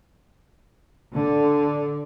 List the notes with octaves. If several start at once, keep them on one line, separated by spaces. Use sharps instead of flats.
D3